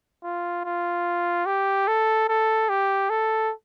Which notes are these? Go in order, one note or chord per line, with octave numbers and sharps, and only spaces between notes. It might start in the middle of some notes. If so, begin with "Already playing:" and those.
F4
F4
G4
A4
A4
G4
A4